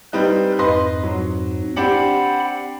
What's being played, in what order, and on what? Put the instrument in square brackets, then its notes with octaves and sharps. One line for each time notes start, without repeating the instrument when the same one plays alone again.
[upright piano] G3 C4 D#4 [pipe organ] B4
[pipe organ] F2 G#2 [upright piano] B4 D#5 C6
[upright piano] F#3
[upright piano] C4 D4 G4 [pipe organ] F#5 B5